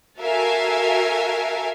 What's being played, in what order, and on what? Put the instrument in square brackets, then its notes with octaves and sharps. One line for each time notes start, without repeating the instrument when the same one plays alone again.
[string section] F#4 A4 A#4 E5 F5 G#5